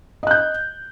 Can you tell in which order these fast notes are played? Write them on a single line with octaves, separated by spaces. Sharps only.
D#5 F#6 G6